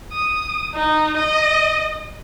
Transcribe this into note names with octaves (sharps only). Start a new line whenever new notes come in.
D#6
D#4
D#5